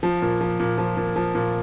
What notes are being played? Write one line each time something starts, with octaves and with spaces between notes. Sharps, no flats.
F3
A#2
F3
A#2
F3
A#2
F3
A#2